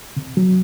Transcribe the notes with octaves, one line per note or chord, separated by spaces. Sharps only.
C3
F#3